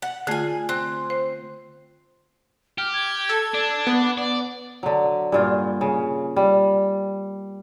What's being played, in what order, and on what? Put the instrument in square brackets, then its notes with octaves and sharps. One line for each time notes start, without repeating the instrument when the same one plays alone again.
[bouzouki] F#5
[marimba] D3 A3 F4 [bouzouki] G#4 G#5
[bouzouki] C4 [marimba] F#6
[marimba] C5
[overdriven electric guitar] G4 [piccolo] F6
[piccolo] G#6
[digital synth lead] A4
[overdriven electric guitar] D4
[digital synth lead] B3
[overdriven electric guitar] D5
[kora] D3 F#3
G2 A#2 F4
C#3
G3